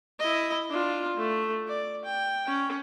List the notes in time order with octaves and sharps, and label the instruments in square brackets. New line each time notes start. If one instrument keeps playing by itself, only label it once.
[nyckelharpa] E4 D#5
D4 F4
A3
D5
G5
C#4